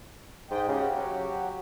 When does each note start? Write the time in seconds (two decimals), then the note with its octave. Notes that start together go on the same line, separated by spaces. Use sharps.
0.51 G#2 D#5 G5
0.68 C#3 F#4 G4
0.96 F#3